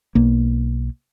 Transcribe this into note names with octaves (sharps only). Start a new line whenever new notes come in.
B1 A#3